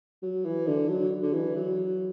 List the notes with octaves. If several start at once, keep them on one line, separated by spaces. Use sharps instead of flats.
F#3
E3
D3
F#3
D3
E3
F#3